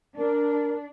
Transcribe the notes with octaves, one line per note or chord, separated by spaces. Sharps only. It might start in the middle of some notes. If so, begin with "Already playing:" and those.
D4 A#4